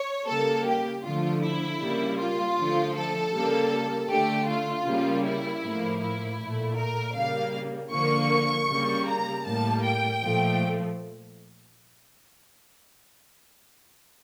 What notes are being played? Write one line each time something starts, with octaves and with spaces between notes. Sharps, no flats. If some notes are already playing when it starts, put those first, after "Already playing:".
Already playing: C#5
C#3 G3 A#3 A4
G4
D3 F3 A3 F4
E4
C#3 G3 A#3
F4
D3 F3 A3
A4
C#3 G3 A#3
D3 A3 G4
F4
C#3 G3 A#3
E4
A2 F3 A#3
E4
A#2 A3
A#4
C#3 G3 A#3 F5
D3 F3 A#3 C#6
C#3 G3 A#3
A#5
A2 G3 A#3 A5
G5
A#2 F3 A3